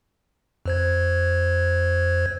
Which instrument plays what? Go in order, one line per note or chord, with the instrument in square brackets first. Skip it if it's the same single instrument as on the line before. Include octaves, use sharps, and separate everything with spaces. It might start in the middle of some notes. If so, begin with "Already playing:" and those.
[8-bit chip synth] F2 C5 G#6